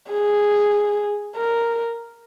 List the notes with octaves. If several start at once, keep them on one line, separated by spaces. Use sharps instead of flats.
G#4
A#4